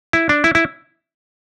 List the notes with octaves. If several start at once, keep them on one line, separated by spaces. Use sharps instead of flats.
E4
D4
E4
E4